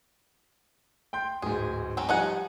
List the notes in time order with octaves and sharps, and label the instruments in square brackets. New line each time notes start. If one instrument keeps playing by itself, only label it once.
[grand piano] G5 C6 G6
[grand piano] D1 G#2 [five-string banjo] G#4
[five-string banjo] F#3 C4 C#4
[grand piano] F3 G3 [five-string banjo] D#4 G#4 F#5